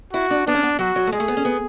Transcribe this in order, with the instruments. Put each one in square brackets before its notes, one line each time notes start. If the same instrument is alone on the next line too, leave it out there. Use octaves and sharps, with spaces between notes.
[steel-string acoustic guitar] E4 [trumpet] F#4
[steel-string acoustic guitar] D4
[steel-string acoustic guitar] B3 [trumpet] D4
[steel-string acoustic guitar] C#4
B3
[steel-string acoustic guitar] F#3 [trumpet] F#4
[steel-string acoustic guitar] F#3
A3
[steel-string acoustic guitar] G#3 [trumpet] G#4
[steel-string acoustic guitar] A3
B3
C#4
B3